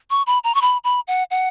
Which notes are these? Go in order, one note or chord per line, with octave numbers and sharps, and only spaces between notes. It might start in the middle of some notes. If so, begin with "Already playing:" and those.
C#6
B5
A#5
C#6
B5
B5
F#5
F#5